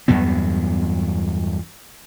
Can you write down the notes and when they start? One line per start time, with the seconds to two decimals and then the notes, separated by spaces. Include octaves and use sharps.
0.08 E2 G2 F#3 B3